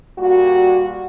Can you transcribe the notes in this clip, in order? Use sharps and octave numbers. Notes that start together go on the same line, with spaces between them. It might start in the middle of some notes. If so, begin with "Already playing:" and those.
A#2 G3 F#4